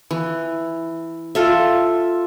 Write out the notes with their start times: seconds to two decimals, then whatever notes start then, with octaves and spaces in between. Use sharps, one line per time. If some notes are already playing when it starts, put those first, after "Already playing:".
0.11 E3
1.35 F4 A4 E5